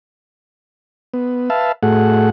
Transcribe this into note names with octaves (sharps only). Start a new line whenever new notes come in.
B3
B4 E5 F5 A5
A2 A3 F#4 G#4 F#5